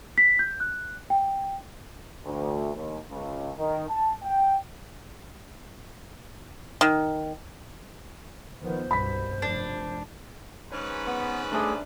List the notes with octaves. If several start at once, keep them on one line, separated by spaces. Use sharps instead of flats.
B6
G6
F#6
G5
D2
D#2
C#2
D#3
A5
G5
D#3
D#3 F3 B3 C5
C2 G2 B2 B5 B6
F1 D4
G#2 C#4 B4
B3
A3 D4 G#4 E5